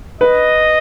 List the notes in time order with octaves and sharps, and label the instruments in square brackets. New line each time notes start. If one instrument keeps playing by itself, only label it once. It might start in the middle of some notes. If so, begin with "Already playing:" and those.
[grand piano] B4 [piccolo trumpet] D#5